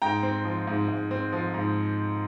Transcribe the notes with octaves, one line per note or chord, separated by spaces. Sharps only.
G#2 G5 A#5
C4
F3
G#2
G#2
C4
F3
G#2